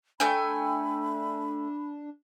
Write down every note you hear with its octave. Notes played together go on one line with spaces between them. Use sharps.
A3 D4 G5 G#5 B5